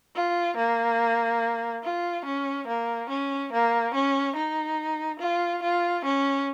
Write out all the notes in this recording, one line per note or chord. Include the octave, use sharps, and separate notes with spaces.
F4
A#3
F4
C#4
A#3
C#4
A#3
C#4
D#4
F4
F4
C#4